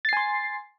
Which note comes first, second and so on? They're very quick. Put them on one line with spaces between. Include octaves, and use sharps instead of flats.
A6 C7 G#5 C6